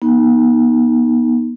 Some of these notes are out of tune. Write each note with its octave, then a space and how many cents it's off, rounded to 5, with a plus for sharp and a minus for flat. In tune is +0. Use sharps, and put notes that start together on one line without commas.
B3 -40 D#4 +0